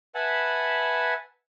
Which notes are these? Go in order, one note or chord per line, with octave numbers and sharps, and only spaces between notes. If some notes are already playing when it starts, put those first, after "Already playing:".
B4 E5 F#5 G#5 A5 B5